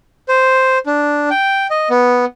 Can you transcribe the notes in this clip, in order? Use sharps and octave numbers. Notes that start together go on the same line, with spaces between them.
C5
D4
G5
D#5
B3